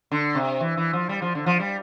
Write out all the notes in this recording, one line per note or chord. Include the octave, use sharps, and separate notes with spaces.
D3
C3
E3
E3
F3
G3
F3
D3
F3
G3